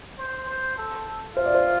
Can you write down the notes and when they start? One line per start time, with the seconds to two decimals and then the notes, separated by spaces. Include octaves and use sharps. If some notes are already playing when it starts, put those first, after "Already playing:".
0.19 C5
0.49 C5
0.78 A4
1.36 F4 C5
1.46 D5
1.55 C5